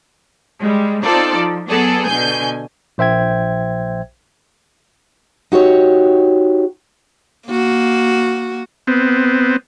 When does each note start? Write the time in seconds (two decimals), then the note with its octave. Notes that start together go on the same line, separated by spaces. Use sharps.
0.59 G3 G#3
1.04 C4 D#4 F4 A4 D5
1.37 F3
1.68 F#3 B3 G#4 A4 D5
2.06 B2 D3 G#5 G6
2.98 A#1 C5 E5 G5 G#6
5.52 D#4 F#4 G4 C#5
7.47 A#3 F#4
8.87 B3 C4